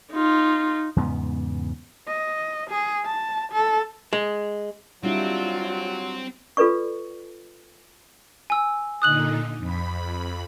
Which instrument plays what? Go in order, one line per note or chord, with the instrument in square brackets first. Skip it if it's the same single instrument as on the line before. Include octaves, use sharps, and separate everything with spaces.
[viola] D#4 F4
[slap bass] E2 G#2 C#3 B3
[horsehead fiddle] D#5
G#4
A5
A4
[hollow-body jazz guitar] G#3
[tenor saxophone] F#3 [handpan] G3 D4 E4 [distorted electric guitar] C4 [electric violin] F4
[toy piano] F4 A4 B4 D5 C#6
[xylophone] G#5 E6
[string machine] A#2 D3 D#4 [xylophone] D#6 F#6 F#7
[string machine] F2 B5